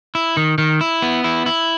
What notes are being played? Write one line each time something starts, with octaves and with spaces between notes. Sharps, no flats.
E4
D#3
D#3
E4
B3
E4
E4